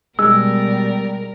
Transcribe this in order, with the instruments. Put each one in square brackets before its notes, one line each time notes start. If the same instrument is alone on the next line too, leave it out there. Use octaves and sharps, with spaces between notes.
[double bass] B2 G3 [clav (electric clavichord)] G#3 [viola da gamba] A#4 [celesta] E6